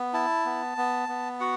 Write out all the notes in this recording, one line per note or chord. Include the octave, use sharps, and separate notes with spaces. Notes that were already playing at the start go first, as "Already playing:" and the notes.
Already playing: B3
E4 A5
B3
B3
B3
F#4 F#5